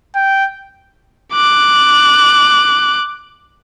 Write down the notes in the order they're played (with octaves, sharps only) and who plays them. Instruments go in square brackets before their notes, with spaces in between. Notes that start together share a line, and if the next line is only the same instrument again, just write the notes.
[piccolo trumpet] G5
[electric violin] D6 F#6